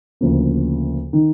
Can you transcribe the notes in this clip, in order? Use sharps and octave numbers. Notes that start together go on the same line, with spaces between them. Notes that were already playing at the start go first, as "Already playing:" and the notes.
D2 C#3 F3 A#3
D#3